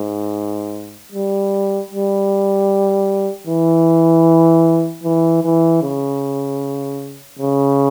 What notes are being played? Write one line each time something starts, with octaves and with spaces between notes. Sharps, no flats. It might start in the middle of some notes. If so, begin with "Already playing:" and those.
Already playing: G#2
G3
G3
E3
E3
E3
C#3
C#3